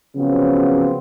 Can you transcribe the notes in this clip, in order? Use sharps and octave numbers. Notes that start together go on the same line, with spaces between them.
C#3 F3 F#3 B3 C4